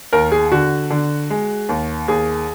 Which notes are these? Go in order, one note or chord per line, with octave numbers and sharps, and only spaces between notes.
D#2 A#4
G#4
D3 F#4
D3
G#3
D#2
D#2 G#4